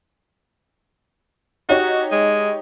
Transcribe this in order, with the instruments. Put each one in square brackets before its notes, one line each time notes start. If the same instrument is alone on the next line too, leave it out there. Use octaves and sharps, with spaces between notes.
[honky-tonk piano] D#4 G4 C#5 [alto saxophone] F#4
[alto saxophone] G#3